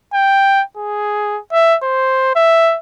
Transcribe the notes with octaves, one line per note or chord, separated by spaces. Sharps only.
G5
G#4
E5
C5
E5